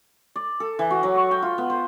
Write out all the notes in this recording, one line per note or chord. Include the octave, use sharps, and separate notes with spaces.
D5
A4
E3
F#4
F#3
C#6
G5
F4
B3
C5